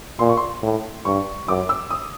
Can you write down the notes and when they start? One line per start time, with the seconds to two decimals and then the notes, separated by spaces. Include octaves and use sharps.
0.19 A#2 C6
0.29 C#6
0.37 C6
0.63 A2
1.05 G2 C#6
1.48 F#2 D6
1.69 E6
1.91 D#6